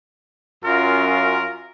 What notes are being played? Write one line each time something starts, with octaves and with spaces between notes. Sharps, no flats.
F#2 F4 A#4